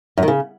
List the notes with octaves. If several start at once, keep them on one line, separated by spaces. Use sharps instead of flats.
F#2
D#3
C#3